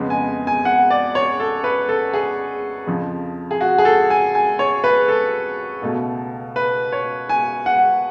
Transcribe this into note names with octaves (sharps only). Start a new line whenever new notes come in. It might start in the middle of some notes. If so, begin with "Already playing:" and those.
Already playing: F2 C#3 G#3 B3
G#5
G#5
F#5
D5
C#5
A4
B4
A4
G#4
F2 C#3 F3
G#4
F#4
G#4
A4
G#5
G#5
C#5
B4
A4
C#2 B2 A3
B4
C#5
G#5
F#5